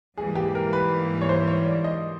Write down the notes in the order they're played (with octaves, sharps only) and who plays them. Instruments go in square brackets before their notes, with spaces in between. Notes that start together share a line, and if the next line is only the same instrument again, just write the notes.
[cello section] G#2 E3 G3 A#3 [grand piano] G#4
[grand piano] G4
A#4
B4
C#5
C5
C#5
D5
D#5